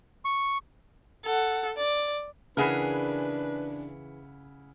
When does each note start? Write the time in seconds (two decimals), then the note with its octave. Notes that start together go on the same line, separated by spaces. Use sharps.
0.25 C#6
1.25 A4 F#5
1.77 D5
2.57 C#3 E3 D4 E4 G#4 A#4 B4 F#5